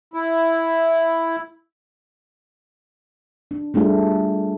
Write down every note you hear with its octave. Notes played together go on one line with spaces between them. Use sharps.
E4
D4
G3 A3 D4 F4 G#4